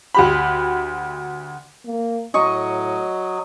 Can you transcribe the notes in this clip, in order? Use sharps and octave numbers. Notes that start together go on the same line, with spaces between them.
D2 G4 B5
A#3
A2 F#3 D#5 C#6